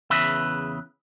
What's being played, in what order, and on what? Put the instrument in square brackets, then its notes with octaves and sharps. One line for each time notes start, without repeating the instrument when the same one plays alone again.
[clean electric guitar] E2 C#3 B4 E5